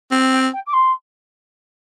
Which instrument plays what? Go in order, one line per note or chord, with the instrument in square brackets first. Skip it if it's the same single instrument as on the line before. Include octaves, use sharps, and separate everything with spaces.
[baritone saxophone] C4 [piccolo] G5
[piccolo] G5
G5
D6
C6